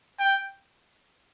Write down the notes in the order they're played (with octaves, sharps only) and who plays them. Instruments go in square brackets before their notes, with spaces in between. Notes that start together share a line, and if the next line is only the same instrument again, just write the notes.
[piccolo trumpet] G5